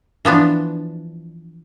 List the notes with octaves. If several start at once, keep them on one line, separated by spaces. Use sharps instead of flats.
E3 F3 B3 D4